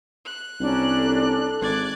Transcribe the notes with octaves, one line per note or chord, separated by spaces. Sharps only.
F#6
C2 C#4 D4 A#4
A4
G#1 D5 F#6 G#6